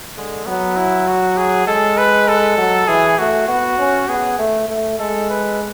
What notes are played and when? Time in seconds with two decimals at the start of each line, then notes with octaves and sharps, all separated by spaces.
0.17 D3 G#3
0.46 F#3 B3
0.77 E4
1.07 F#4
1.37 G#4
1.67 G#3 A4
1.97 B4
2.28 A4
2.58 F#3
2.88 E3 G#4
3.18 A3 F#4
3.48 B3 F#4
3.79 C#4
4.09 B3 G#4
4.39 A3
4.69 A3
4.99 G#3 A4
5.30 B4